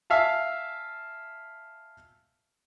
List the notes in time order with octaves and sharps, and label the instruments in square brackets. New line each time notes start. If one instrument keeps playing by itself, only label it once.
[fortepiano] E5 F5 G#5 A5